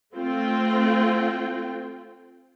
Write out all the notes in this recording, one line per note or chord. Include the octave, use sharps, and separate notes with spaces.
A3 C4 F4 G5